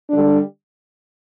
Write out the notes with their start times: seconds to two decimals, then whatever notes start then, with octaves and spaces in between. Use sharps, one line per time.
0.10 D3 G3 D4